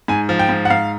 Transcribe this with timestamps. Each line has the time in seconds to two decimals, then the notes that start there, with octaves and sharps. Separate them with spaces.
0.08 G#2 G#5
0.29 F3
0.39 G5
0.49 G#2
0.65 F#5
0.70 G#2 F5